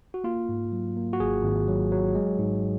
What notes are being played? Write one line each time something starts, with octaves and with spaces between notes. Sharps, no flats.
F#4
A#3 F4
G#2
F#3
A#3
F#4
G#1 G#4
G#1
F#3
F#3
G#3
G#2